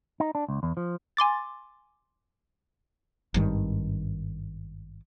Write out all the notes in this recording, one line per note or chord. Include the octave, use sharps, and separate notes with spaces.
D#4
D4
C#2
E2
F3
G#5 C6 D6 A6
G#1 G2 D#3